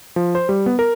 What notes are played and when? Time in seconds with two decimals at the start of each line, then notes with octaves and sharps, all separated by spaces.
0.16 F3
0.35 C5
0.49 G3
0.66 B3
0.79 A#4